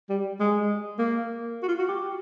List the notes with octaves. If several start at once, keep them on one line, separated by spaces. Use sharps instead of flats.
G3
G#3
A#3
F#4
F4
F#4
G4